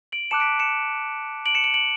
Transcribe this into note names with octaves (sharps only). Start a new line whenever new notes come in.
D7 F#7
A5 D6 F#6 C#7 E7
B6 D7
C#7 E7
D7 F#7
C#7 E7
D7 F#7
D7 F#7